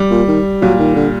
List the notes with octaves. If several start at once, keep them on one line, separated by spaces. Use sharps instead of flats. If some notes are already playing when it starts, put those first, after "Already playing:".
Already playing: G3
A#2
D#3
A#2 F#3
D#3
D3